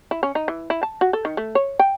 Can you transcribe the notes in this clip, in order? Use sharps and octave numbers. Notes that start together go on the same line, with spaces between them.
E4
C#4
D#4
E3
E4
A5
F#4
A4
D#3
A3
C#5
G5